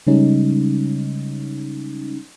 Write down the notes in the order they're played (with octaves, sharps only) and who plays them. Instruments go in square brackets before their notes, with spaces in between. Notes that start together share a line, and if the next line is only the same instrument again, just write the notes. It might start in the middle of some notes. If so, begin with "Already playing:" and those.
[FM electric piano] C#3 G3 G#3 C#4 D#4